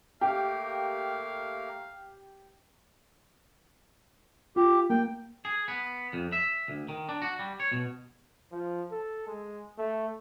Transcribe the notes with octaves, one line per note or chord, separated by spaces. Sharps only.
A3 A#3 G4 A#4 F5
F4 G4
A#3 G5
G#4
B3
F2
E5
D2
D#3
D4
F#4
G3
C#5
B2
F3
A4
G#3
A3